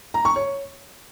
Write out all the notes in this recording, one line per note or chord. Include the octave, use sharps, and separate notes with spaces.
A#5
C#6
C#5